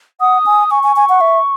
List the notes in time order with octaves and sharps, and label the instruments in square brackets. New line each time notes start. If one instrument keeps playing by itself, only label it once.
[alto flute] F#5 [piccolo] D#6
[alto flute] G#5
[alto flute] G#5 [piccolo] C#6
[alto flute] G#5
G#5
F#5
E5